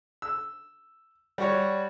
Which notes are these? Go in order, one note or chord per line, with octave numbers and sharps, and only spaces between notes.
E6
G3 F#4 C#5